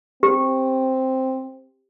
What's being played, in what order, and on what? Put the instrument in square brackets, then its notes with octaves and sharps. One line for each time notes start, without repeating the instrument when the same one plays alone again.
[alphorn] C4 [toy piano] G4